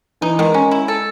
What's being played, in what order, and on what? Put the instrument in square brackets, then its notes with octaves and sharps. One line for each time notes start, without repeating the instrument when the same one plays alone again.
[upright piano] E3 [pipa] D#4
[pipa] D#3 [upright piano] G#3
[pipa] C#4
E4
A4